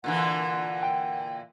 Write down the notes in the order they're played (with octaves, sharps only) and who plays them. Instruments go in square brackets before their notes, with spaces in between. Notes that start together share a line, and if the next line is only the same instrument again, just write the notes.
[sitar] A#2 D3 E3 [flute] F#5
[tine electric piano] G5